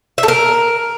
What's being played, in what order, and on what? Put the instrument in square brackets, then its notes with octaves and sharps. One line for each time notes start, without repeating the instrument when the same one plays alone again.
[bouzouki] E5
A4
A#4